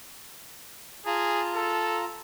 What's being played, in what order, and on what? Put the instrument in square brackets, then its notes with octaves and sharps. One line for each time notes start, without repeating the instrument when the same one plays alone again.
[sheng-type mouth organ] F4 A5 A#5 [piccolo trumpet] G#4
[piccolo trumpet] A4